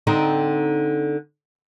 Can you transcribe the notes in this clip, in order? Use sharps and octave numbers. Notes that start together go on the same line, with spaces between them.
D3 C4 D#4